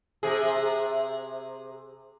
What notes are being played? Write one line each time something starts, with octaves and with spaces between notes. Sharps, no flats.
C3 G#4